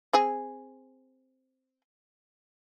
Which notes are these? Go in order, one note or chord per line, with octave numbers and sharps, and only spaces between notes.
C4 G#4 G#5